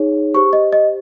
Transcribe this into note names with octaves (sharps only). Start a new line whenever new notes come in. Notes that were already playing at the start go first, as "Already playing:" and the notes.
Already playing: D#4 G#4 C#5
G4 C5 C#6
D#5
D#5